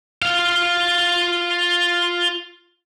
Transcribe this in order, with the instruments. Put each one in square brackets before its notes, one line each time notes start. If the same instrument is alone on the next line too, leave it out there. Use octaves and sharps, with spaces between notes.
[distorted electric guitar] F4 F5